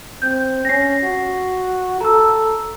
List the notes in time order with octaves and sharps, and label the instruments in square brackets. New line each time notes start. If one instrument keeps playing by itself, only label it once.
[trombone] C4 [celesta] G6
[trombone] C#4 [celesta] A#6 C7
[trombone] F#4
[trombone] A4 [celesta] A#5 E6